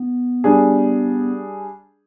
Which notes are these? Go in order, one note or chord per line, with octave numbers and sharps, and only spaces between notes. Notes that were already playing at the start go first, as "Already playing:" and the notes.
Already playing: B3
G3 D4 G#4